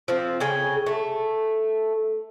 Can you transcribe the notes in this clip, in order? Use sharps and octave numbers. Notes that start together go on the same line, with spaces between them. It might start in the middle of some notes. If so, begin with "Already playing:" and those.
F3 C4
C#3 G#4 G5
A3